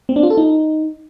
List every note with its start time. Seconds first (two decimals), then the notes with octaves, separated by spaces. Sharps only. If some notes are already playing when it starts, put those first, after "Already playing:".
0.09 C4
0.16 D4
0.23 F4
0.30 A4
0.37 D#4